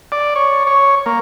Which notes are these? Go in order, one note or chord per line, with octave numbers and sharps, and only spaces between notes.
D5
C#5
C#5
A#3